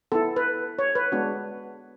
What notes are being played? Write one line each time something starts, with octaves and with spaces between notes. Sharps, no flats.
B3 E4 A4
B4
C#5
B4
G#3 B3 D4 F#4